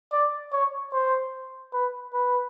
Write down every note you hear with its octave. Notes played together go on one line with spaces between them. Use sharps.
D5
C#5
C5
B4
B4